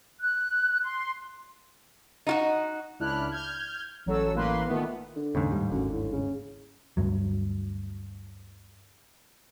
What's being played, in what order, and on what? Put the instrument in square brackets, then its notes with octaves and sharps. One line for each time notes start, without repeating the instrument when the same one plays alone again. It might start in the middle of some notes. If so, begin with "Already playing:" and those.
[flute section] F#6
C6
[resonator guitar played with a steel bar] D#4 F4 F#4
[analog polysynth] C#2 D4 E4 F6 F#6
F6 G6 G#6
A1 F#3 A4 E6
A1 A2 A#3 B4 C6
A#2 D#3 A3 B3
[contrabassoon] D3
[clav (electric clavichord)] D#2 G#2 [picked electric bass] C#3
[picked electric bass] A2 G3
[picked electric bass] G1 D3 [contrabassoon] F#2
[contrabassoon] A2
C#3
[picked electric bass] D2 G2 F#3